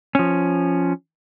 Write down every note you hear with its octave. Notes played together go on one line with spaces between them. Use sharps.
F3 C#4